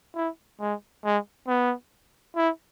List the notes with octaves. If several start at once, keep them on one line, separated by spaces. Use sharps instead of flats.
E4
G#3
G#3
B3
E4